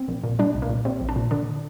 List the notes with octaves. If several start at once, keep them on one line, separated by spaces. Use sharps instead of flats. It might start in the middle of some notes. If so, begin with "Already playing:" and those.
Already playing: C4
A#1
A#2
G3 D4
C2
A#3
A#2
G3 C4
A#1
D4
A#2
D3 D4